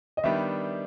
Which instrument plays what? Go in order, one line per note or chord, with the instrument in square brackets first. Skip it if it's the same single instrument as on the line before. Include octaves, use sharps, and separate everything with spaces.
[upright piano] D#5
[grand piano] D#3 G3 B3 D4 G4 [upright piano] E5